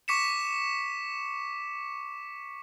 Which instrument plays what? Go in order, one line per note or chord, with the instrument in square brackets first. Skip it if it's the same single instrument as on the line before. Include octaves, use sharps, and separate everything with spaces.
[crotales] C#6 D6 B6 C#7 E7